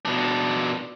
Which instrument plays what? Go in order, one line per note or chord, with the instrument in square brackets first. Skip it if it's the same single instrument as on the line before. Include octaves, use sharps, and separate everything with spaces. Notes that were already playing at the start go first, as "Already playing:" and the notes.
[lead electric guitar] B2 D4